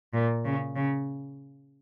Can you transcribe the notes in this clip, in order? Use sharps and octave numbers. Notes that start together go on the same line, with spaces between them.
A#2
C#3
C#3